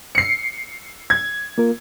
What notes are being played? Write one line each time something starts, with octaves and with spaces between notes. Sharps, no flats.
C7 C#7
G#6
A#3 F4 A#4